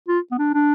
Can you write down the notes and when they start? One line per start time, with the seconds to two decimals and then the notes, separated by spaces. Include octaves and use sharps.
0.08 F4
0.32 B3
0.39 D4
0.54 D4